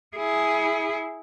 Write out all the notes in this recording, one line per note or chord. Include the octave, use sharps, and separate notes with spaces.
E4 G#4